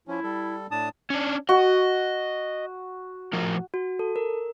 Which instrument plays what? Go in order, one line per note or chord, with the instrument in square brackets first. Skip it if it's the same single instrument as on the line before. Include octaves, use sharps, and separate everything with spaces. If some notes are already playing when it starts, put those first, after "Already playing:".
[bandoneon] F3 C#4 [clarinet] E4
[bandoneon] G3 A4
[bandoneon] A2 D4 D#6 [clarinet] A5
[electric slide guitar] C#4 D4
[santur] F#4 [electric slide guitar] D#5
[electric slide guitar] A2 F3 A#4
[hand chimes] F#4
A4
A#4